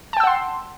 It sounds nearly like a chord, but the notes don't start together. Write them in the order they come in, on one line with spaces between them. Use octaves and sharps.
A5 G5 E6 F#5 C6